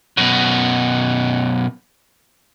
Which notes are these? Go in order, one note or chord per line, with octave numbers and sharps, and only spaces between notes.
F#2 B2